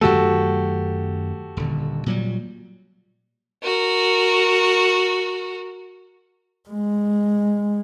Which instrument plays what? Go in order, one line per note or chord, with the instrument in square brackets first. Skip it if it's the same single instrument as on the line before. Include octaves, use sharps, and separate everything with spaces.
[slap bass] F#2 D#3 A3 [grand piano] F#4 G4 A4
[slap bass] D#1 D3
A#2 F#3 G3
[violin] F#4 A#4
[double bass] G#3